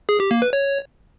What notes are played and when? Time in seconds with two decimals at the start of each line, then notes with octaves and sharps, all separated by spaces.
0.09 G#4
0.20 G4
0.31 A#3
0.42 B4
0.53 C#5